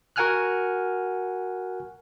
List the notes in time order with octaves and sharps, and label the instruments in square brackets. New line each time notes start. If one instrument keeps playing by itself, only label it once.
[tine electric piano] F#4 A#4 F#5 G#5 F6 F#6